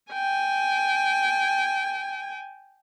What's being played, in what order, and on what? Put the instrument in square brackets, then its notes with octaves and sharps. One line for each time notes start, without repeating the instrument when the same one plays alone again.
[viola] G5 G#5